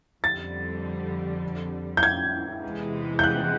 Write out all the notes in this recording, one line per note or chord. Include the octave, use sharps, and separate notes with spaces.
F2 D3 G3 A6
G6
G#6
E2 C3 E3 G#3
G6
F#6